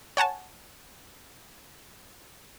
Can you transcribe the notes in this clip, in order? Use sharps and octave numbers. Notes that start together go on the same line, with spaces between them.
C#5 F#5 G#5 A5